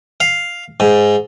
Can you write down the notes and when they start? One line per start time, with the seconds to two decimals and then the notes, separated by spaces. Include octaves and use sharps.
0.20 F5
0.80 G#2